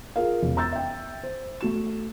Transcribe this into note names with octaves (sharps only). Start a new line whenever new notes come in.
F4 G#4 A#4 F5
E1
A#5 E6 G6 A6
E5 G5
C5
A3 F#4 E7